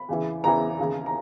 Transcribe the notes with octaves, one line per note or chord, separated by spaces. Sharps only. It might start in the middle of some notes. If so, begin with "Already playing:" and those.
Already playing: B5
E2 C#3 E3
E2 C#3 E3 A#5
D#2 C#3 E3
A#5